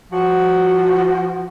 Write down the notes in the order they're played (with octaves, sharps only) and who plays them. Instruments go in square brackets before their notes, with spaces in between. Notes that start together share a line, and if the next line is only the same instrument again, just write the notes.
[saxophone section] F3 F#4